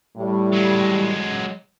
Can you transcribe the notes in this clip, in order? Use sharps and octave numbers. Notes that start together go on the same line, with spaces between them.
A2 G3
F#3 G#3